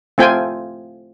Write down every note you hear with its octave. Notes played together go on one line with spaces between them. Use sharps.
A3 C4 F4 G5 G#5